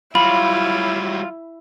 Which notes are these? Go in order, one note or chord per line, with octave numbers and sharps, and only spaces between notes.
F#3 G3 E4 F4 B5